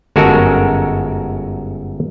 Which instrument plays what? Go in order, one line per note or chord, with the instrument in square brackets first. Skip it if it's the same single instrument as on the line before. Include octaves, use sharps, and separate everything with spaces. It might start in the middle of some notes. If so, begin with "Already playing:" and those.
[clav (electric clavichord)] G1 F#2 G#3 F#4 A4 A#4